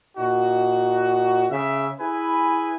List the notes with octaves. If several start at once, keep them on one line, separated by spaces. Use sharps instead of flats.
A#2 D#4 F#4
C#3 E5
E4 G#4 B4 G#5